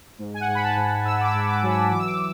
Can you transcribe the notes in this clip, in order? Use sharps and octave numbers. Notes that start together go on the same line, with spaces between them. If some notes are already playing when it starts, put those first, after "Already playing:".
G#2
G#5
F#5
G#2
B5
A5
G#2
G#2 E6
D6
E6
G#2
D6
F#3
E6
E3 D6
E6
D6